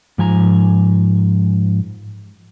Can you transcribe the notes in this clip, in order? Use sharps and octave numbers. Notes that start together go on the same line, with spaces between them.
G#2 F3 G#5 A#5